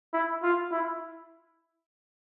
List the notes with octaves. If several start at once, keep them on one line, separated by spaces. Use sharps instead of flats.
E4
F4
E4